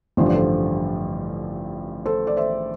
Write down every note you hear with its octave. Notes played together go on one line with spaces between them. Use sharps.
A1 G2 D3 F3 C5
D5
A4 C5
A4 C5
D5
C5 E5